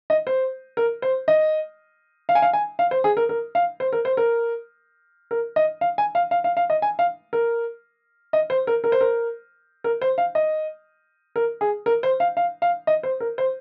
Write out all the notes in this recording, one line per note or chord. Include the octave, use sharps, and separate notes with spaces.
D#5
C5
A#4
C5
D#5
F5
G#5
F5
G#5
F5
C5
G#4
A#4
A#4
F5
C5
A#4
C5
A#4
A#4
D#5
F5
G#5
F5
F5
F5
F5
D#5
G#5
F5
A#4
D#5
C5
A#4
A#4
C5
A#4
A#4
C5
F5
D#5
A#4
G#4
A#4
C5
F5
F5
F5
D#5
C5
A#4
C5